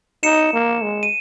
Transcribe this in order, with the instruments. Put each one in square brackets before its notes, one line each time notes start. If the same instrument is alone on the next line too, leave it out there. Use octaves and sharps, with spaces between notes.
[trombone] D#4 [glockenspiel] C#7 E7
[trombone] A#3
G#3
[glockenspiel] D#7